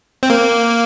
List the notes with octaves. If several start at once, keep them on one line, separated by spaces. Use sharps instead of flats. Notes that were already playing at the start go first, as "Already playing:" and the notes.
C4
A#3